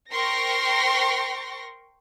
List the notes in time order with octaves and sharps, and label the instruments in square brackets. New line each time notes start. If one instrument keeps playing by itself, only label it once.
[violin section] A#4 C5 G5 C6 C#6 A#6